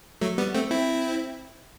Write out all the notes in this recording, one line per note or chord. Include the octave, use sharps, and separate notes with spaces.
F#3 A3
G3 B3
A3 C4
C4 E4